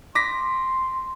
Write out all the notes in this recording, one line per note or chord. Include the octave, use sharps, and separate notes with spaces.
C6 D6 A#6 B6